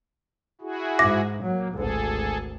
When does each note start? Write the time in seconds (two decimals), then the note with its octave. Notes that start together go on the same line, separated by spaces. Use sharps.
0.61 E4 F#4 G#4
0.99 G#2 E5 D6 A#6
1.43 F#3 A#3
1.73 G#1 D2 G#4 A4